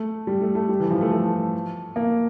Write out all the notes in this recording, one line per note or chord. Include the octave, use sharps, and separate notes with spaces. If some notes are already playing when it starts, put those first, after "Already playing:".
Already playing: A3
G3
A3
A3
G3
E3
F3
A3
A3
A#3